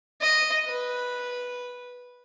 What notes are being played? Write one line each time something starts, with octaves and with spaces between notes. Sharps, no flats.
D#5
B4